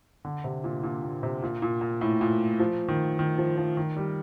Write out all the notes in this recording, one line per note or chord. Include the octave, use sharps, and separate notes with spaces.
D3
C3
A#2
A#2
A#2
C3
A#2
A#2
A#2
A2
A#2
F3
D#3
D#3
F3
F3
D#3
G3